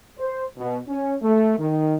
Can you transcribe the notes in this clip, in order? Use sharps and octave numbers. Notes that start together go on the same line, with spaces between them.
C5
B2
C#4
A3
D#3